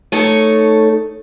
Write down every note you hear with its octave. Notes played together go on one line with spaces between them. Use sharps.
A3 D#4 A4 C#5